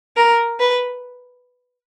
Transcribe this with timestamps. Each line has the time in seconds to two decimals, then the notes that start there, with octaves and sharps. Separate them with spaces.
0.16 A#4
0.60 B4